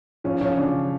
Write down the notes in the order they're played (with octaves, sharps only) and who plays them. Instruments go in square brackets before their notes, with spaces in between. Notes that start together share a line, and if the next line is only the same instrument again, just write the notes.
[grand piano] F3 [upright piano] C#4
[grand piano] F3 [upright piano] C#4
[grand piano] C#3 [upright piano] D4